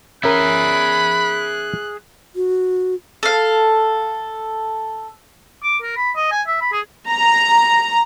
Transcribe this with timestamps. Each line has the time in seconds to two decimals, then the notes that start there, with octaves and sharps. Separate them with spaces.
0.24 C#4 G#4 A#4 E5 B5 F#6
2.35 F#4
3.23 A4 F5
5.63 D6
5.82 A#4
5.96 B5
6.16 D#5
6.32 G#5
6.47 E5
6.61 B5
6.72 G#4
7.09 A#5